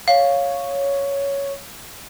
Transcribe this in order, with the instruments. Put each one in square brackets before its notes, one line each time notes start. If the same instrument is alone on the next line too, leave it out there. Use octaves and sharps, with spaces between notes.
[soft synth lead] C#5 [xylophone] F5